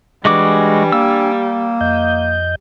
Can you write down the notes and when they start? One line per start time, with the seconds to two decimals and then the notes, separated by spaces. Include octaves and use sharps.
0.25 E3 G3 G#3 D4 F#4 G#5 D6
0.92 A#3 E6
1.81 F2 D#5 G6